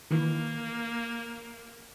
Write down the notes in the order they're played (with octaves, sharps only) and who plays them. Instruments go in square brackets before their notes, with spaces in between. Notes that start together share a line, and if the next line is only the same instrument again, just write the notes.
[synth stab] D#3 E3 [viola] A#3